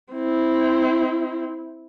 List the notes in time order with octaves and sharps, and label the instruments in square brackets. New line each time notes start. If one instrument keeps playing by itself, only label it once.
[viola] C4 E4